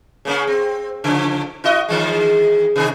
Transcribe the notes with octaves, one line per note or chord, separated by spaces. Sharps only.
C#3 A#3 C#4
C4
C#3 F3
E4 F#4 D#5
D#3 E3 G#3
C3 D#3 G#4